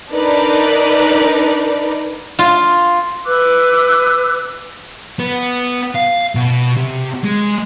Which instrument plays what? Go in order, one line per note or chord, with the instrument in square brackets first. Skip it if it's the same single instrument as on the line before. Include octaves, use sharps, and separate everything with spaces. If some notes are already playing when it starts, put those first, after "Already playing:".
[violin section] D4 D#4 A#4 B4 D5
[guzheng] F4
[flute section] B4 D6 E6 F#6
[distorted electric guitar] B3
F5
B2
C3
G#3